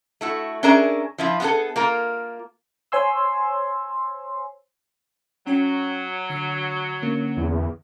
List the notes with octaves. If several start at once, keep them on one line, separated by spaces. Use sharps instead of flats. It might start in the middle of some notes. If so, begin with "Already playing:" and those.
A3 E4 F#4
C#4 D4 G#4 A#4 E5 G#5
F3 E4 F4
B3 F4 F#4 G#4 A4
A#3 F4 A#4
C5 C#5 G#5 C6 E6
F#3 C#4 G5 A#5
D3 E6 C7
D3 A#3 C#4
E2